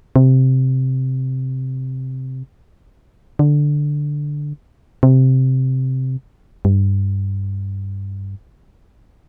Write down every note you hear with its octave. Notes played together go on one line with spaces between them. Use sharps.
C3
D3
C3
G2